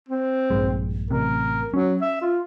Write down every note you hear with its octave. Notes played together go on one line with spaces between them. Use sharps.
C4
A#1 G2 G#3
A1 C3 A#4
F#3 C#4
E5
F4